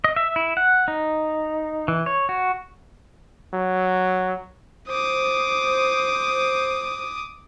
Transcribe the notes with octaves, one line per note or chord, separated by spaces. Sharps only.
D#5
E5
E4
F#5
D#4
E3
C#5
F#4
F#3
C5 D6 D#6